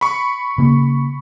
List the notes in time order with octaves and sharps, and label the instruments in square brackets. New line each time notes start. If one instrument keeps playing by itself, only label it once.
[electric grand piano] B5 C#6
[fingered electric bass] C#3 A#3